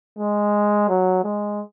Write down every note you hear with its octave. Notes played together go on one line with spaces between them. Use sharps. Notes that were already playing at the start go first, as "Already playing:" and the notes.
G#3
F#3
G#3